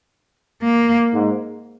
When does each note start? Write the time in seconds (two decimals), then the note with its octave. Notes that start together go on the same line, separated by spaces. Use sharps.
0.62 A#3
1.14 G#2